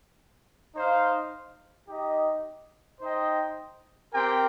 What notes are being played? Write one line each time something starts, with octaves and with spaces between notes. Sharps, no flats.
D#4 C5 F5
D#4 G4 D#5
D#4 C5 D#5 G5
C4 G4 A#4 G5